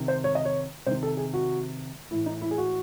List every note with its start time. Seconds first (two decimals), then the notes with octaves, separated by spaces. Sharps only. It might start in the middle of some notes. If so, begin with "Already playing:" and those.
Already playing: C3 D#3
0.08 C5
0.24 C#5
0.35 D#5
0.45 C#5
0.86 C3 D#3 C5
1.03 A4
1.17 G#4
1.34 F#4
2.11 A2 E3 E4
2.26 D#4
2.42 E4
2.51 G#4
2.58 F#4